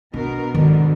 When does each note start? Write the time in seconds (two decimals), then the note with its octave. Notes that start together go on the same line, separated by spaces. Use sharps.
0.14 B2 B3 D4 A#4
0.55 G#2 B2 D3 D#3